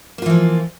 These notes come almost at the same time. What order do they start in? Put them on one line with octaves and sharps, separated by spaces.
A#3 F4 E3 F3